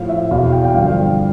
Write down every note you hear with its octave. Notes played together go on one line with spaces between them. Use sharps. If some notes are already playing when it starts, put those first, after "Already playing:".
Already playing: A2 F3 F5
E5
E2 B2 F5
G5
G5
G2 D3 F3 F5